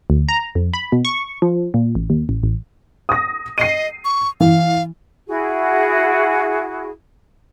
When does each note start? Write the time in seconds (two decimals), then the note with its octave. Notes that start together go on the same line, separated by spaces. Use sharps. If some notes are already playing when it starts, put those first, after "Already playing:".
0.10 D2
0.29 A#5
0.55 F2
0.74 B5
0.92 B2
1.05 C#6
1.42 F3
1.74 A#2
1.95 A1
2.10 D#2
2.29 A1
2.43 A1
3.09 D#6 A#6
3.58 D#5 C7 D#7
4.05 C#6
4.40 E3 F5
5.28 E4 F#4 G#4